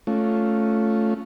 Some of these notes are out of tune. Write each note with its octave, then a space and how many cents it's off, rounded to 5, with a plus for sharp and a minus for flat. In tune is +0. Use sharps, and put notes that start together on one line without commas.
A3 -10 C#4 +0 F4 +0